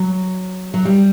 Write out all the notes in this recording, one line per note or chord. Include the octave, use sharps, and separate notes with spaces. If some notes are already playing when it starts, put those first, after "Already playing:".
Already playing: F#3
F#3
G3